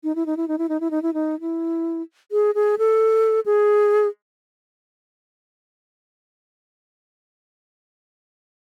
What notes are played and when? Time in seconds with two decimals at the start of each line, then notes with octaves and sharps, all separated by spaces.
0.04 D#4
0.15 E4
0.26 D#4
0.37 E4
0.48 D#4
0.58 E4
0.69 D#4
0.80 E4
0.91 D#4
1.02 E4
1.14 D#4
1.41 E4
2.32 G#4
2.55 G#4
2.78 A4
3.46 G#4